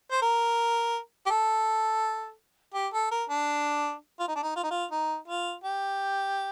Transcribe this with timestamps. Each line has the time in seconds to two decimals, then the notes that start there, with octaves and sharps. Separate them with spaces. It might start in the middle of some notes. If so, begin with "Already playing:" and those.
0.11 C5
0.22 A#4
1.26 G4
1.30 A4
2.74 G4
2.93 A4
3.11 A#4
3.30 D4
4.19 F4
4.28 D#4
4.35 D4
4.43 D#4
4.56 F4
4.63 D#4
4.70 F4
4.91 D#4
5.28 F4
5.64 G4